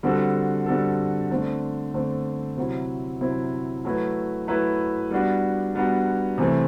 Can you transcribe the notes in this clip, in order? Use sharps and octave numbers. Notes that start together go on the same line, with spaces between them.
D3 G3 C4 F#4 A4
D3 G3 C4 F#4 A4
D3 A3 C4
D3 A3 C4
C3 F#3 C4 E4
C3 F#3 C4 E4
F#3 A3 E4 B4
F#3 A3 E4 B4
G3 B3 D4 F#4
G3 B3 D4 F#4
C3 E3 A3 C4